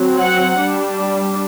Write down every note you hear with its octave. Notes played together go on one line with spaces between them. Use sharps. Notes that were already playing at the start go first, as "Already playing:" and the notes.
Already playing: F#3 C4
F#5
G3 D4